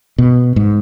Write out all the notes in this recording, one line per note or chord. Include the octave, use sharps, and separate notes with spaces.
B2
G#2